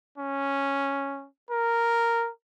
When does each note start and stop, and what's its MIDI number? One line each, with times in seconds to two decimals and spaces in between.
0.18 1.27 61
1.50 2.30 70